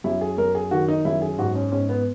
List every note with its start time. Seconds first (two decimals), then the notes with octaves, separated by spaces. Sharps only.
0.04 F#2 E4
0.21 G#4
0.38 F#2 A#4
0.55 G#4
0.71 D#3 F#4
0.88 D#4
1.05 F#2 E4
1.22 G#4
1.38 G#2 F#4
1.55 C#4
1.72 G#2 C#4
1.89 B3